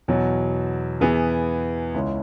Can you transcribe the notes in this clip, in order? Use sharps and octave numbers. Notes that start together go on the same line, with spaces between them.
E2 B2 F#3
E2 E3 B3 G#4
C#2 C#3 G#3 C#4 E4